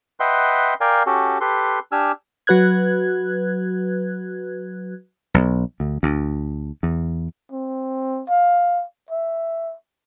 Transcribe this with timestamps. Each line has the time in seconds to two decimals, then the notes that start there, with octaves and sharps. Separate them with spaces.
0.20 B4 D#5 E5 F#5 G5 C6
0.81 A#4 D5 F5 G5 G#5
1.06 C#4 F#4 G4 A4
1.41 G4 A4 B4 C6
1.92 D4 G4 G#5 E6 F6
2.47 F#3 F#4 B4 F#6 G#6
5.34 B1
5.80 D2
6.03 D2
6.83 E2
7.52 C4
8.29 F5
9.11 E5